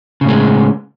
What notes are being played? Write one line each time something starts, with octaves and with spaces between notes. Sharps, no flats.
A2 C#3 G#3